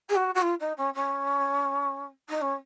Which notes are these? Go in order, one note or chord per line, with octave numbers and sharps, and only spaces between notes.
G#4
F#4
F#4
F4
D#4
C#4
C#4
D#4
C#4